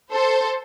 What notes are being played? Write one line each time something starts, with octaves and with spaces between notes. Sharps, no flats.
A4 C5